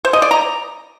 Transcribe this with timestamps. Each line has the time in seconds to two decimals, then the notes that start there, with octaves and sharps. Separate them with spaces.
0.05 C5
0.13 D#5
0.22 D5
0.31 A#5